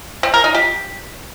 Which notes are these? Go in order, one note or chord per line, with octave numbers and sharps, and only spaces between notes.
C4
A#4
D#4
G4